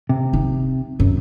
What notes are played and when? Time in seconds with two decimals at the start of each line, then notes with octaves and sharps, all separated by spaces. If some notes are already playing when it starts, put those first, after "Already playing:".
0.09 C3
0.33 D#4
1.00 F#2